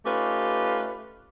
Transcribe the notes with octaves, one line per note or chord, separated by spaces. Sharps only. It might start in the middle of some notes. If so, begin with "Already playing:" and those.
A3 C#4 D#4 F4 G4 B4